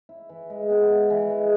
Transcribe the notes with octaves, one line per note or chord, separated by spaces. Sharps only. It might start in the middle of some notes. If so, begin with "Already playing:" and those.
E4
E3
G#3
B3
E4
E3
G#3